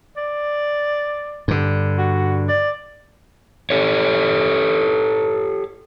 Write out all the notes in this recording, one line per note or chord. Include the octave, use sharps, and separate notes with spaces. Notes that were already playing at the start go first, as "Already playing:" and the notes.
D5
G2 D3
F#4
D5
G4 A4 C#5